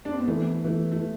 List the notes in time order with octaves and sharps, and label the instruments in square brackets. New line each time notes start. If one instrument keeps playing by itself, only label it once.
[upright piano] D4
C4
B3
[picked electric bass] E3 [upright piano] A3
[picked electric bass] E3 [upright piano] A3
[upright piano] A3